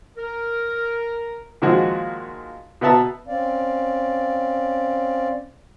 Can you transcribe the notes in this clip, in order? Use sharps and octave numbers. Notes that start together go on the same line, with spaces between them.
A#4
A#2 D#3 F3 G#3 F#4
B2 B3 B4 E5 A5 A#5
C4 C#4 D5 F5